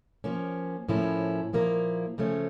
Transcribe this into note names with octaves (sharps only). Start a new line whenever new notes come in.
F3 A#3 C#4
A2 F3 A#3 C#4 E4
A#2 F3 A#3 E4 A#4
C#3 F3 A3 C#4